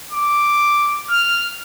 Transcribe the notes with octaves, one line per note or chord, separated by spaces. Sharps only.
D6
F6